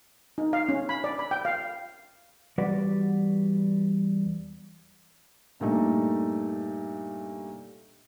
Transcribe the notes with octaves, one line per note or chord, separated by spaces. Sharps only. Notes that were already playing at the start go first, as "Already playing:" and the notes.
D#4
F5
C#4
B5
D5
B5
G5
F5
E2 G3 F#4 B4 D5 F#5
G2 A#2 G3 A3 D#4